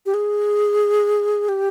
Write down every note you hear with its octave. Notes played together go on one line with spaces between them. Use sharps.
G4
G#4
G4